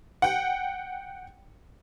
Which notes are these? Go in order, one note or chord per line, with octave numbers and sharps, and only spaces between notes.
F#5 G5